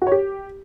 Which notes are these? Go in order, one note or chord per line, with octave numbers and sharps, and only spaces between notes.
F#4
C#5
G4